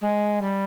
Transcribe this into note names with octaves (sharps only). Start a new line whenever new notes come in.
G#3
G3